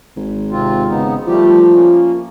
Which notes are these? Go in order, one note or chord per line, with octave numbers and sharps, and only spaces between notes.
G#1
C3 C4 F4
C#3 B3 D#4
F3 G3 A3 G4
A#3 C#4